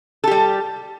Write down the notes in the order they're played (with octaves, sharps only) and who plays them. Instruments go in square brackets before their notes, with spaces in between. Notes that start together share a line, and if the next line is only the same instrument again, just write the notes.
[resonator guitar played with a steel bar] A4
G4
G3